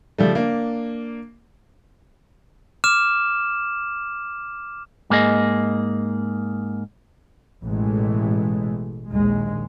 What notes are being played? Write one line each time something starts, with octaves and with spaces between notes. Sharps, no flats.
C#3 F3 G3 A3
A#3 D4
D6 F6 E7
G#2 A#3 G#4 D#5
A1 B2 E3 G#3 A3
A#1 D#2 G#3